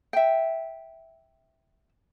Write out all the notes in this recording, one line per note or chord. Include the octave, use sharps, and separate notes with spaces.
E5 G5